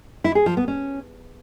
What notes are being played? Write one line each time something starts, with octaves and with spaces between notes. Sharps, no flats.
E4
G#4
F3
B3
C#4